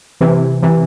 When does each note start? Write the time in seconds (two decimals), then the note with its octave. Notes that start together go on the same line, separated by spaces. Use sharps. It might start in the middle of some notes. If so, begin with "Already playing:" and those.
0.21 C3 E3
0.63 C3 E3